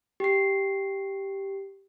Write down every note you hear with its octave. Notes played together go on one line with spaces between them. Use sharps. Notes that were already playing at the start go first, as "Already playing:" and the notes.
G4 C7